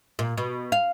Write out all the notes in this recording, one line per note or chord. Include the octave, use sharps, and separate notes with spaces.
A#2
B2
F5